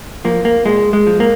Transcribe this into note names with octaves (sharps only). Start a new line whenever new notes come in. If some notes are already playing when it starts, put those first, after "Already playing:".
F3 A#3
A#3
A#2 G#3
G#3
F3
A#3